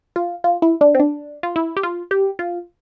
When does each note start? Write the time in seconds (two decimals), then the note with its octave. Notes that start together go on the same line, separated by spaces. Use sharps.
0.16 F4
0.44 F4
0.62 E4
0.81 D4
0.95 C4
1.00 D4
1.43 F4
1.56 E4
1.77 G4
1.83 F4
2.11 G4
2.39 F4